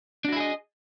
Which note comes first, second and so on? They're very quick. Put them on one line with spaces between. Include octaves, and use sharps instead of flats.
D4 F#4 E4 G#4 D#5